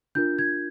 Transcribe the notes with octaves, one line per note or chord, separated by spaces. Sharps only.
D4 F4 A#4 G6
G#6